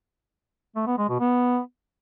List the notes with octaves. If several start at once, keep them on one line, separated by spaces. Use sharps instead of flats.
A3
B3
G#3
B2
B3